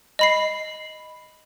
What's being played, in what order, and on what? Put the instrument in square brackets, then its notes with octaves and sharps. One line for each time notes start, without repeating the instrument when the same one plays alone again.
[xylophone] D#5 B5 C7